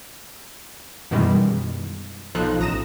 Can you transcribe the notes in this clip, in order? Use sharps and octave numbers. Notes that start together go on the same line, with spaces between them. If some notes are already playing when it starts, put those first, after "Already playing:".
F#2 B2 D#3 E3 G3 G#3
B1 F3 D#4 F4 A4 F#6
A1 A#5 D#6 A#6 E7